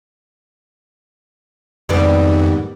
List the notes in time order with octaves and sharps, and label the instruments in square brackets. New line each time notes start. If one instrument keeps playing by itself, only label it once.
[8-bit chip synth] F2 [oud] G#2 G3 B3 [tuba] D#3